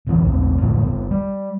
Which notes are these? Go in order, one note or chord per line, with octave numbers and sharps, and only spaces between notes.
D1 G1 F2 E3
A#1 E2 C4
F2 A2 D3 F3
F#1 B3
G3